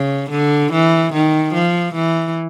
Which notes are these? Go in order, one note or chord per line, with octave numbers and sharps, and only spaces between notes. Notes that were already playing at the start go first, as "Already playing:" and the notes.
Already playing: C#3
D3
E3
D#3
F3
E3